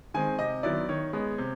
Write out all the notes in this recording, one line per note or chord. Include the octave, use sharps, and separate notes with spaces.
D#3 G#3 C4 G#5
C3 D#5
D#3 F#3 B3 E4 D5
D#3 C#5
G#3 B3
C3